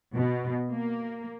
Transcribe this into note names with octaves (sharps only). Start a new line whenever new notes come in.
B2
A#3